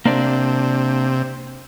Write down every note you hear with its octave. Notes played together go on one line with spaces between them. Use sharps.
C3 A#3 D4 D5